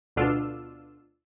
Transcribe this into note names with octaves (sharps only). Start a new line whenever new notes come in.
D2 B2 D4 F4 E6